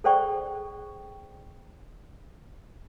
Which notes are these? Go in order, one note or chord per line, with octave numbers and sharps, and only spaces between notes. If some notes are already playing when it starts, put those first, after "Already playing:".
G#4 A4 C5 D5 G5 C#6